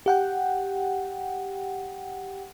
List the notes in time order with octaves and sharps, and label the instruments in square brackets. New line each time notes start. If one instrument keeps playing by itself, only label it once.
[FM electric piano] G4 F#5 G5